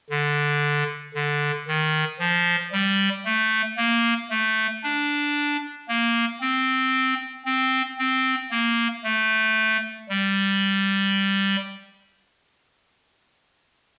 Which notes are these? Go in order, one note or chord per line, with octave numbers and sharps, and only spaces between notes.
D3
D3
D#3
F3
G3
A3
A#3
A3
D4
A#3
C4
C4
C4
A#3
A3
G3